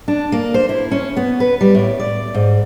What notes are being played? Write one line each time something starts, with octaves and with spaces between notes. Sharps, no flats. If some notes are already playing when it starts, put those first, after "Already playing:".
D4
A#3
C5
E4
C#4
B3
B4
G3
A2
D5
G#2